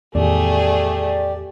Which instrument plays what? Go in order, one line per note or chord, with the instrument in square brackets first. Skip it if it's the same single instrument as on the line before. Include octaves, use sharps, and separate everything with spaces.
[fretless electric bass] E2 A2 D#3 [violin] A3 G#4 [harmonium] G4 [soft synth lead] D5